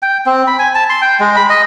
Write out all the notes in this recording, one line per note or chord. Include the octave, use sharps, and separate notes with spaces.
G5
C4
B5
G#5
A5
C6
G5
G#3
B5
D#5